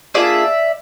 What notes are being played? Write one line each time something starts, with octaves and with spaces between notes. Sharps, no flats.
A#3 D4 F4 G#4 D5 E5